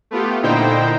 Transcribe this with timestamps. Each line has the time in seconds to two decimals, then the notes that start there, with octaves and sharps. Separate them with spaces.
0.11 A3 B3 F4 G4
0.43 A#2 D3 D#4 E4 C5 G5